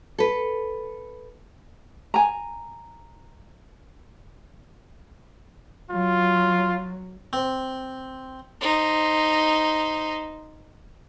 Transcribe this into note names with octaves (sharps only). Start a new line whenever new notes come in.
A4 B4
G#5 A#5
F#3 F4
C4
D#4 C5